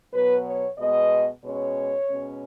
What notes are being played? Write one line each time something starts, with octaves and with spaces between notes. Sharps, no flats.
B2 F#3 B3 B4
C#5
B2 G#3 B3 D#5
B2 G#3 C#4 C#5
B2 G#3 C#4